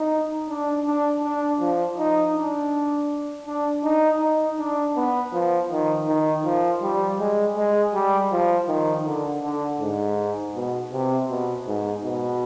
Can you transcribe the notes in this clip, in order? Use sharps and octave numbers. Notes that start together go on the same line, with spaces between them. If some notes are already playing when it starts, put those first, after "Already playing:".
Already playing: D#4
D4
D4
D4
F3
D#4
D4
D4
D#4
D#4
D4
B3
F3
D#3
D#3
F3
G3
G#3
G#3
G3
F3
D#3
D3
D3
G#2
B2
C3
B2
G#2
B2